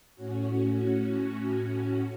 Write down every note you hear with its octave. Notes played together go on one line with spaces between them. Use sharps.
A2 C#4 F#4